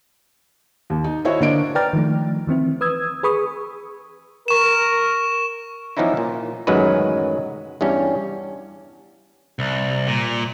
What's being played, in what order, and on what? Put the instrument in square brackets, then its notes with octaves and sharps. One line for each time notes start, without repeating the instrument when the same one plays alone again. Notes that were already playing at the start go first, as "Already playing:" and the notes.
[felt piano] D#2
D#4
E4 F#4 C5 C#5 D#5 E5
D3 A#3 D4 D#5 D7
[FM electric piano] B4 D5 G5 A#5 F6 A6
D#3 F3 A3
D#3 E3 C4 E4
B4 D#6 E6 G#6
G#4 B4 B5 C#6 D#6
[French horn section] A#4 [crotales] C#6 E7
[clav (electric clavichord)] E3 F3 B3 C#4 D#4 E4
A#2
A1 F#2 D#3 F#3 G#3 B4
E2 G2 G3 C#4
[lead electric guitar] C2
A#2